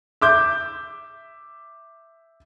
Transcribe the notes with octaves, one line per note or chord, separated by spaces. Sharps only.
E5 D6 G6